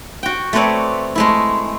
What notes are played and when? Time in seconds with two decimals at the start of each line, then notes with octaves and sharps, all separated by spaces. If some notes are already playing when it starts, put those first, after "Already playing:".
0.23 F#4 G5
0.53 A3 C4 A4 B4 C#5 D5
1.15 G#3 A3 E4